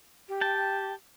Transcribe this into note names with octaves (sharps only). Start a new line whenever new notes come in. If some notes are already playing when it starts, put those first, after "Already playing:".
G4
G5 A5